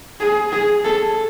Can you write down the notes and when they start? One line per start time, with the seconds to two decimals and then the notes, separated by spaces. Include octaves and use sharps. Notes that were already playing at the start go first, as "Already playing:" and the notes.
0.20 G#4
0.52 G#4
0.84 A4